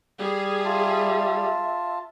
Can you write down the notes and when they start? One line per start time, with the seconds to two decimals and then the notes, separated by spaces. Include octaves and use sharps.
0.20 G3 G#4
0.65 F4 E5 A5